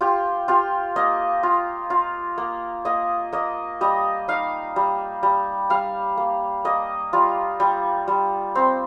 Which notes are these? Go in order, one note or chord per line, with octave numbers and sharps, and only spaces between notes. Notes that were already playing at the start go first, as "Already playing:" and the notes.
F4 G4
F4 G4
A#3 D#5
F4
F4
A#3
A#3 D#5
A#3 D#5
G3 D#5
D#4 F5
G3
G3
G3 F5
A#3
A#3 D#5
G3 F4
G3
G3
C4